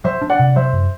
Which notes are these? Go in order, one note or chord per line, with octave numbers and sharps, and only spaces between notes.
F#3 C5 E5
D4
D5 F#5
C3
F#3 C5 E5
F#2